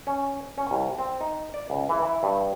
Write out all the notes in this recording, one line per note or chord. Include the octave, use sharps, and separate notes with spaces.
C#4
C#4
C2
C4
D#4
D5
C#2
E3
E4
G2